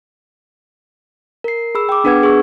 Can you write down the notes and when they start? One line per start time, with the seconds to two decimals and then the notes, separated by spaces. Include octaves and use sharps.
1.44 A#4 C7
1.75 G#4 B5 E6
1.89 G5 D6
2.04 B3 D4 G#4 B4 F#5 G#6
2.23 G#4 C#6 E6